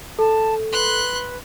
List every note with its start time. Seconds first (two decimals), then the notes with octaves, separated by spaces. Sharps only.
0.19 A4 A5
0.72 B4 C6 F#6